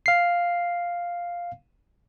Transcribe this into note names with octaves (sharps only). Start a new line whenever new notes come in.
F5 C7